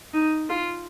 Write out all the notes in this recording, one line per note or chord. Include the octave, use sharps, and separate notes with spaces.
D#4
F4